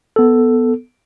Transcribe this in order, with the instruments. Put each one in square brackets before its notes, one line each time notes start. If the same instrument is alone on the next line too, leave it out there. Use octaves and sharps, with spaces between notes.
[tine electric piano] B3 A4